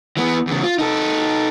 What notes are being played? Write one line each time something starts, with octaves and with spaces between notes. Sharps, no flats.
E3 B3
E2 C#3
F4
D#4 A4